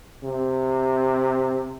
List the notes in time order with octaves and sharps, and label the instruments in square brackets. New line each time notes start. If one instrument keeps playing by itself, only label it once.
[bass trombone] C3